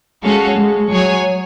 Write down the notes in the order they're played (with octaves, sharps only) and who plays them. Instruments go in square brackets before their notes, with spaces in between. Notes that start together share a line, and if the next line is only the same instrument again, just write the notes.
[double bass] G#3 [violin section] C#4 F#4 A4 F5
[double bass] G#3
[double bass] F#3 [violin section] G#4 C#5 G#5